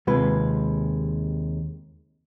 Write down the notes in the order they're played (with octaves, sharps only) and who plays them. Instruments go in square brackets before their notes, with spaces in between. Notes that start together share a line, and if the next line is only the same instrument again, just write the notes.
[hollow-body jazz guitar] D#2 C3 G#3 F4 B4